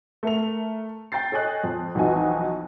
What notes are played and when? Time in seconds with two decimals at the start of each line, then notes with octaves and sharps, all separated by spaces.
0.23 A3 A#4 F7
1.12 G5 G6 A6 C7
1.32 A4 C#5 D#5 G#5 F#6
1.64 F2
1.95 B1 F2 E3 D#4 F#4 G#5